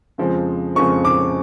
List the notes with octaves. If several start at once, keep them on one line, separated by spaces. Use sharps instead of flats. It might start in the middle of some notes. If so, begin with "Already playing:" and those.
F2 C#3 F3 G#3 C4
F2 C#3 F3 G#3 C4 C#6
D6